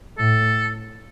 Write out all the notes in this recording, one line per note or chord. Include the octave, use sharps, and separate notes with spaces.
A2 A4